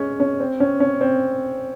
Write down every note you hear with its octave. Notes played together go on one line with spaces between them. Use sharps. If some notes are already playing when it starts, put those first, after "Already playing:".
Already playing: G#3 C#4
C#4
C4
C#4
C#4
C4